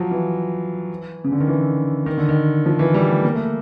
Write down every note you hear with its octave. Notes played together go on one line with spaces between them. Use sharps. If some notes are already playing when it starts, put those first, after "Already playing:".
Already playing: F3 F#3
E3
C#3
D3
D#3
E3
D#3
D3
D#3
F3
E3
G3
A3
A#3
A3